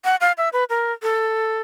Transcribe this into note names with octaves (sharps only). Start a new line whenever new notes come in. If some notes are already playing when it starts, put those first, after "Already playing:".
F#5
F5
E5
B4
A#4
A4